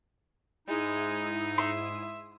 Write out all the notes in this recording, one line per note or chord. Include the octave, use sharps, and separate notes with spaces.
G#2 G#3 D#4 E4 D#6
E5 C6